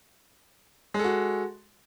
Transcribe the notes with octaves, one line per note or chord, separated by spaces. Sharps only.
G#3 F#4 A4